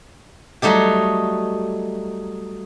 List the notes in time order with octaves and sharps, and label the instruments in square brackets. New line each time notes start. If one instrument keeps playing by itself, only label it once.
[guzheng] F#3 G3 A3 D#4 G4